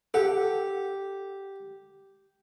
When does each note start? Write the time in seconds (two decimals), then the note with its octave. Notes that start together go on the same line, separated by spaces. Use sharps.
0.14 G4 A4 F#5